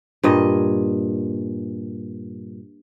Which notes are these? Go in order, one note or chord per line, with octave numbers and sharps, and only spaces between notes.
G2 A#2 D#5